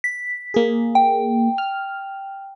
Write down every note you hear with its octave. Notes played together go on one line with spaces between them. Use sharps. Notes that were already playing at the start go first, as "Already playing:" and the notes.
B6
A#3 G#4
G5
F6